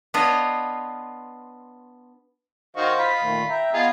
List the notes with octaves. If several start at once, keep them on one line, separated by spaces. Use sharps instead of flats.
B3 D4 F4 C#5 D#5
D#3 F#4 C5 D#5 F5
F4 B5
A#2 D#3 A3
E5 G5 A#5
B3 F4 G#4 D#5